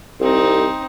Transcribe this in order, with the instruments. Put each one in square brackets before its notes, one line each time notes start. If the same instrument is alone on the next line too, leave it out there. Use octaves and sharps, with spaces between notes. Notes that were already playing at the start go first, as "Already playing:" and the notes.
[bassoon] C2 [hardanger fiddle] C4 D#4